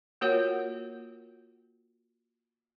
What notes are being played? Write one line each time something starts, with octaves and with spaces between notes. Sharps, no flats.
A#3 F4 F#4 A#4 C#5 F#5